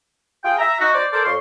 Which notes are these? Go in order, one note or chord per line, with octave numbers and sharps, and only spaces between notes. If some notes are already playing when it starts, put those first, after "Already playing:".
F4 G#4 G5
E5 A#5
D#4 F#4
C5 D5
A4 A#4 C5 D5
F2 C#5 C6